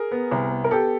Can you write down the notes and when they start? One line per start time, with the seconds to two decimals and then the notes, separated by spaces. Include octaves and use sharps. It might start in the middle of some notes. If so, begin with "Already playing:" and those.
Already playing: G#4 A#4
0.11 B3
0.31 C2
0.51 B3
0.64 A#4
0.71 B3 G4 A4